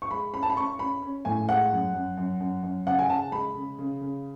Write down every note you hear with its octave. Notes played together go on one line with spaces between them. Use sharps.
C#6
G#3 B5
C#4 B5
A5
B5
C#4 C#6
C#4 B5
C#4
A2 G#5
G#3 F#5
F#2
F#2
F#2
F#2
F#2
C#3 F#5
G#5
C#3 A5
G#3 B5
C#3
C#3
C#3